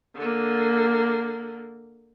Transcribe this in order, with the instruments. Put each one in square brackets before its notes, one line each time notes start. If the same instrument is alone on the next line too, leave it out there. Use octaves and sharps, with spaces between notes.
[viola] D3 A#3